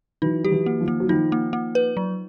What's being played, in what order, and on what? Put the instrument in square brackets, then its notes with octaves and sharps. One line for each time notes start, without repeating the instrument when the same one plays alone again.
[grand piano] E3 F#3 [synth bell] D#4
[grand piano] G3 [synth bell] G4
[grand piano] E3 F#3
[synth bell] A#3
[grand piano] D#3 F3
[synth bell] A#3
[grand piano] F#3
[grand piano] D#3 F3 [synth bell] D#4
[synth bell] A#3
A#3
B4
F#3